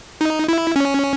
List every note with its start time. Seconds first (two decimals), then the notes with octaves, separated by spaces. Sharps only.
0.21 D#4
0.48 E4
0.76 C#4